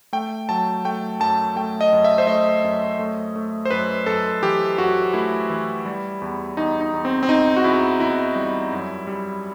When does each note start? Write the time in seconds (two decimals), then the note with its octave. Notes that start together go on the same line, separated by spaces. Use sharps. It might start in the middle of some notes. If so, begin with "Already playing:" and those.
0.13 A3 G5
0.49 F#3 A5
0.85 A3 G5
1.20 F#2 A5
1.56 A3 G5
1.81 D#5
1.93 F#2
2.04 E5
2.18 C5
2.27 A3 D#5
2.64 F#2
2.99 A3
3.36 A3
3.65 C5
3.71 F#2 B4
4.06 F#2 A4
4.42 E3 G4
4.78 F#2 F#4
5.13 A3 E4
5.50 E3
5.85 G3
6.22 E2
6.57 E2 D#4
6.81 D#4
6.93 E2
7.05 C4
7.23 C4
7.28 E2 D#4
7.56 F#4
7.64 E2 E4
8.00 E2 E4
8.36 G3
8.72 F#2
9.07 G3